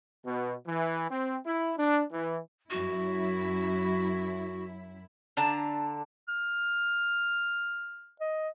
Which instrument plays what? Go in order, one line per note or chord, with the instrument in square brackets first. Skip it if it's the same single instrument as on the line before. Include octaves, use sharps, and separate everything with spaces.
[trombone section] B2
E3
C4
E4
D4
E3
[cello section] F#2 E4 [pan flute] F#4
[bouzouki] D3 D4 A5 A#5
[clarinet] F6
D#5